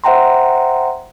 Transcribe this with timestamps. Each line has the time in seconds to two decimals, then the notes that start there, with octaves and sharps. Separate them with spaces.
0.04 C5 E5 F#5 G5 A#5 C6